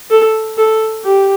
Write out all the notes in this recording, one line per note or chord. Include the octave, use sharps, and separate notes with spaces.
A4
A4
G4